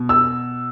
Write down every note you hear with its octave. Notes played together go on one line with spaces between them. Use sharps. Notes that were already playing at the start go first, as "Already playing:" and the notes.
Already playing: B2
E6